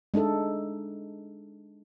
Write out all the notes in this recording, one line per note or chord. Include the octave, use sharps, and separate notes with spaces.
G#3 D4 D#4 A4